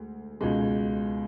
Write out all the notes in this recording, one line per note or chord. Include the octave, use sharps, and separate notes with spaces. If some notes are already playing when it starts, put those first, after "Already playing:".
Already playing: D2 G#3
C#2 B2 G#3